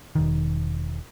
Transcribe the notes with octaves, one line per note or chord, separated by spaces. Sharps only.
E1 D#3